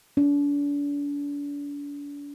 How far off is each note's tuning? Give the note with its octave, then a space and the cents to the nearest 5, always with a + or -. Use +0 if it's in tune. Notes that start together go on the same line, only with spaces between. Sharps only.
D4 -40